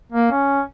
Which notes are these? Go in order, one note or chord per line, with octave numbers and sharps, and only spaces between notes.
A#3
C#4